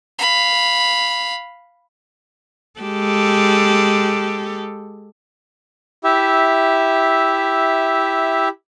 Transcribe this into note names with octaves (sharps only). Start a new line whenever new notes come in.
F5 B5
G#3 G4 A4
E4 G4 E5